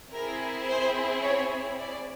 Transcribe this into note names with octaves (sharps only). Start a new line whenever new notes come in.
C4 E4 G#4 A#4
C5
C#5
D5